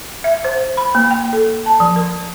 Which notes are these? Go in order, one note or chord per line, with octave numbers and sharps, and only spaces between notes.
E5
C5
B5
A#3
G5
A4
A5
F3
A#4